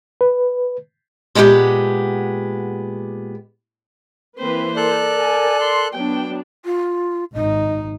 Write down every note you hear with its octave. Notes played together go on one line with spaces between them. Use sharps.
B4
A#2 G#3 B3 C#4 G4 F#5
E3 A#3 C4 B4 C5
A4 A#4 D5 F#6
G#5
C6
F#3 B3 D4 G5
F4
G#1 D#4 D#5